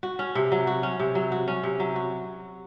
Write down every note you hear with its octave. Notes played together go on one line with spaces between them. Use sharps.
F#4
C#4
C3
F#3
F#4
C#4
C3
F#3
F#4
C#4
C3
F#3
F#4